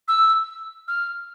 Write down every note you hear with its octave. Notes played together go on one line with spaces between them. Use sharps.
E6
F6